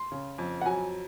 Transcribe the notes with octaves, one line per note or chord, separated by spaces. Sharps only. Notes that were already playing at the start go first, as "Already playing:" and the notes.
Already playing: C6
C#3
F2
F#5
F#3 G#5